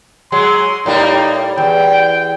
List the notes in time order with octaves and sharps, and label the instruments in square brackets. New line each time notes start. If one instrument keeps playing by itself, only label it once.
[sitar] F#3 G#3 [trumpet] C6
[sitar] A2 G3 A#3 [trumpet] D#4
[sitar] E2 [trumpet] G5